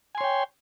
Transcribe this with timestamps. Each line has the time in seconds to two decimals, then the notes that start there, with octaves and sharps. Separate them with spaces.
0.15 G#5
0.18 C6
0.21 C#5
0.24 G5